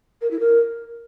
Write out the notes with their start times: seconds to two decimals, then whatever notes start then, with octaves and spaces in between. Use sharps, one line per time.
0.22 A#4
0.31 E4
0.40 A#4